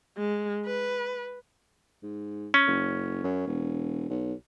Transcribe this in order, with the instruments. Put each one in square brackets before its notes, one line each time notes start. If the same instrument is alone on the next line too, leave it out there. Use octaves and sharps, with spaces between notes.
[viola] G#3
B4
[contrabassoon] G#2
[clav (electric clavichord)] C#4
[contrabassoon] F#1
F#2
E1
B1